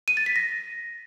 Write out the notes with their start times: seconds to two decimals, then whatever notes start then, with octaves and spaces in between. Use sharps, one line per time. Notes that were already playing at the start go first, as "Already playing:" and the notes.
0.08 D#7
0.17 A6
0.26 B6
0.36 A#6